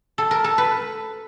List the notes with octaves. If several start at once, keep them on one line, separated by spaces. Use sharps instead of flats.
A4
A#4
A4
B4